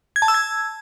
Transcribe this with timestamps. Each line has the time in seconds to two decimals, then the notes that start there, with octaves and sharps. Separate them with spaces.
0.16 G#6
0.22 A5
0.28 E6
0.34 G#6